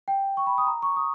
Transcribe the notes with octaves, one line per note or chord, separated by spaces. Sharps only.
G5
C#6
B5
D#6
A#5
C#6
D#6